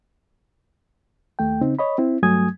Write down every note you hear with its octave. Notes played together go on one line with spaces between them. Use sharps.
D#2 A3 G5
C#3 C4 D#4
C#5 D#5 B5
C4 E4
G2 F#3 A3 G#5 D#6 G#6